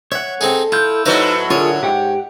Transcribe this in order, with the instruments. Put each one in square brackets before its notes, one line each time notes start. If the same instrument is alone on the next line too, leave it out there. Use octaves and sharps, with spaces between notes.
[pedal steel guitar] C#5 F#5 [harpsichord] E5
[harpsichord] C4 D#4 G#4 [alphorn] A4
[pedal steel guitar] E4 G6 [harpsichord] F4
[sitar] A2 F#3 [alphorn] D#4 [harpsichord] B4 C5 A#5
[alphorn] D3 [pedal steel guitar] F4 G#4 A#4 [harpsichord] C#5
[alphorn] G#2 [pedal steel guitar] G4 F#5 G5